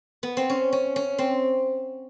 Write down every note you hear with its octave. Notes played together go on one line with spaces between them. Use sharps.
B3
C4
C#4
C#4
C#4
C4